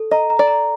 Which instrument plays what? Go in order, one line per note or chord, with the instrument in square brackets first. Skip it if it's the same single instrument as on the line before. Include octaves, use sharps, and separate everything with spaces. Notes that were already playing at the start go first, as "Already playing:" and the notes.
Already playing: [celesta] A4
[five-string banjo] D#5 [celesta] A#5
[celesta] A#5
[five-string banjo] D5
[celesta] A#5